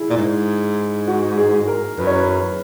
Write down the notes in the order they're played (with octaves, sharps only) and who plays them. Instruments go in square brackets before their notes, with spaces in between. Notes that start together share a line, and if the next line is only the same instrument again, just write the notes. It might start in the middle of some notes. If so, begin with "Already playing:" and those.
Already playing: [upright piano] E4 G#4
[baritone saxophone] A#2
G#2
[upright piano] F#4
G#4
A#4
[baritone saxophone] F#2 [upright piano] B4
[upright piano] C#5
B4